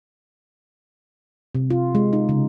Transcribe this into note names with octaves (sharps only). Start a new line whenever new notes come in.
C3
F4
G#3
D#4
C#3